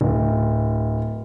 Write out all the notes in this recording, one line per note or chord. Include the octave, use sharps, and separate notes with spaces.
D1